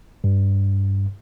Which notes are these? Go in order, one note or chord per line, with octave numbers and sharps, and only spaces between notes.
G2